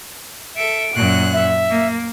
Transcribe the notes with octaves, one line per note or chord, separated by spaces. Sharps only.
A4 E5 D7
F#2 A#2 F#6
E5
A#3